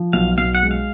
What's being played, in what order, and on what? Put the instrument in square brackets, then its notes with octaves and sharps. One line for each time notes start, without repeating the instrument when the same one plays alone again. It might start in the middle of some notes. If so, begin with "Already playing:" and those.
Already playing: [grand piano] F3
[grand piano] B1 [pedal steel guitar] F5
[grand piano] B1 [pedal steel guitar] F5
[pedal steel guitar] F#5
[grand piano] G#3
[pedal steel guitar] F5